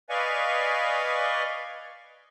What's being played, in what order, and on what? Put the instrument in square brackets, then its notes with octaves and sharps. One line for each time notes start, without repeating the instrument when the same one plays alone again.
[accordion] B4 D5 D#5 F5 G#5 C#6